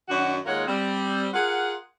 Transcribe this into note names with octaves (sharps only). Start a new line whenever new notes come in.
F#2 D#3 D4 F#4
D#2 G#3 F4 A#4 C#5 F#5
G3 C4
F4 G#4 A#4 F#5